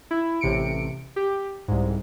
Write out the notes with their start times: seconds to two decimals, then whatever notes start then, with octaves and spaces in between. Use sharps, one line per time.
0.11 E4
0.41 A1 C3 C#7 D7
1.16 G4
1.68 C2 G#2